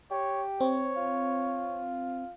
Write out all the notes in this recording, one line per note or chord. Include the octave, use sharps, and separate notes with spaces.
G4 C#5
C4 C#5
F4